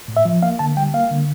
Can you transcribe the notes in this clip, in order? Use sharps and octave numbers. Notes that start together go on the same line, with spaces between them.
A2
E5
F3
A#3 F5
D3 A5
G3 G5
A#3 F5
D3